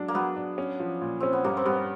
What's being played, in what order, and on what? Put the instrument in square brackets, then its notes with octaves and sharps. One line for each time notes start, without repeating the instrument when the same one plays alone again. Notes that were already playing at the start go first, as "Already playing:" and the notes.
Already playing: [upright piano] F#3 G#3 D4
[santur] A#3
[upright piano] F#3 [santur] B3
[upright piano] D4
C#4
F3
A#2
[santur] C4 [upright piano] C#4
[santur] B3
[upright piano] G2 [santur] A#3
[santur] C4
[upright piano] G2 [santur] B3